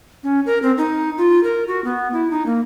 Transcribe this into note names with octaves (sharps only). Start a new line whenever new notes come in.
C#4
A#4
C4
D#4
F4
A#4
F#4
B3
E4
D#4
A#3